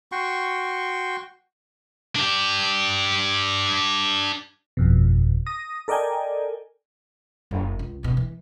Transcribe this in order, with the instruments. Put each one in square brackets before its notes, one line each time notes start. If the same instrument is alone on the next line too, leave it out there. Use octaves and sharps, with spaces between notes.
[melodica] F#4 G5 C6 C#6
[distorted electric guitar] D4 G4
[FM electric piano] G1 F2 B2
D#6 A#6
A4 A#4 D5 D#5 G5 G#5
[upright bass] F#1
C#2
G1 B2
E3